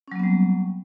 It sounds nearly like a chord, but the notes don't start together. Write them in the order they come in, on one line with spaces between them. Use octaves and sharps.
C#4 F#3 A#3 B3 G3